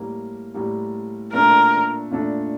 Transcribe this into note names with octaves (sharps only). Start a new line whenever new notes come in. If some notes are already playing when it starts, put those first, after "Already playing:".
Already playing: A2 G3 A#3
A2 G3 A#3
A#2 A3 D4 A#4
A#2 A3 D4